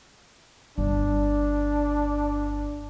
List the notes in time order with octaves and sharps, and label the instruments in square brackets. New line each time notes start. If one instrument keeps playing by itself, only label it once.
[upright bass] G1 [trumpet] D4